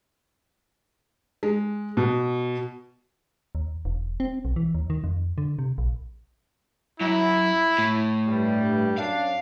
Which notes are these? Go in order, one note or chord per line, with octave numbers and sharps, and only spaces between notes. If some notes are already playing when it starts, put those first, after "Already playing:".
G#3
B2
D#2
E1
C4
B1
E3
D#2
D#3
F2
D3
C3
A#1
F#2 E4
A2
G2 G3
F#2 D4 F5